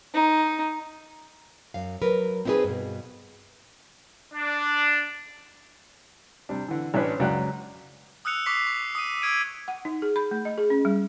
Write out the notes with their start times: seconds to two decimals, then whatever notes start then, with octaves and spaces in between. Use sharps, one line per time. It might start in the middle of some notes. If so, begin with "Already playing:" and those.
0.14 D#4
1.74 F#2 F5
2.02 F#3 A#4 B4
2.45 C4 D#4 E4 F#4 G#4 B4
2.64 G2 B2
4.33 D4
6.49 C3 G3 D4
6.68 D3 E3
6.94 A1 C#4 D4 B4 C#5
7.19 C#2 F#2 G#3 F#4 D5 F#6
8.25 D#6 E6 F#6 C#7 F7
8.46 C#6 D6 B6 C7 F7
8.67 C#6
8.95 D#6 D#7
9.22 D#6 E6 G#6 D7 D#7
9.68 F#5
9.85 D#4
10.02 G#4
10.16 B5
10.31 A3
10.45 D#5
10.58 G#4
10.70 C#4
10.85 G3